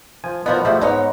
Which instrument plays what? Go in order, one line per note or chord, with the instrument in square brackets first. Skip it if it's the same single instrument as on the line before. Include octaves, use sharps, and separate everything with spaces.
[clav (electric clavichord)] F3 G#5
[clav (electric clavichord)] F3 B3 [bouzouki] D#4 F#4 A#4
[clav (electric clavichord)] F3 A3 G4 [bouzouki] G#3 E4 F#4
[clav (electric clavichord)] G#2 [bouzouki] B3 D#4 C#5